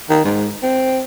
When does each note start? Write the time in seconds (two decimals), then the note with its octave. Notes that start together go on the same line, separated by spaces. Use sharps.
0.10 D#3
0.24 G#2
0.62 C4